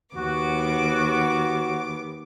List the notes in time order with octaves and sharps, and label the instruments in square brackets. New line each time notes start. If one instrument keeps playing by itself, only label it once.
[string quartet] D#2 B3 D6 [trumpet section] F#4